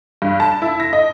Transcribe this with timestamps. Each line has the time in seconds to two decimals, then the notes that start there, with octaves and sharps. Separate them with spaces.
0.22 G2
0.40 A5
0.62 E4
0.80 A#6
0.93 D#5